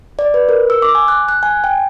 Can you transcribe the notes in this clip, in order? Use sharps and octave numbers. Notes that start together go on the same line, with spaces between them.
D5
B4
A#4
E6
D6
G#5
F#6
F#6
G#5
G5